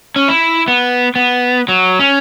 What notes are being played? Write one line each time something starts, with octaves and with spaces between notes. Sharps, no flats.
C#4
E4
B3
B3
F#3
C#4